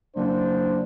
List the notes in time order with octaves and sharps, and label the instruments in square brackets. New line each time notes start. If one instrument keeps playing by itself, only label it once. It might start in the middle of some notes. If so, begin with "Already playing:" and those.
[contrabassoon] F#1 [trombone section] D4 C5